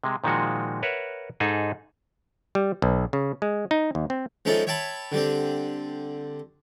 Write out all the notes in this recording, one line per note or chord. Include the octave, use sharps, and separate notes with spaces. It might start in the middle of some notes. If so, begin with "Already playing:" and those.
C3 G#3
A#2 D#3 F3 G#3 F#4
A#4 B4 C#5 E5 F#5
G#2 D#4 G#4 A4 G#5
G3
B1
C#3
G#3
D#4
D#2
C4
F3 G#3 C#4 D#4 A4 E5
C#5 E5 G5 A5 B5
D3 G3 C4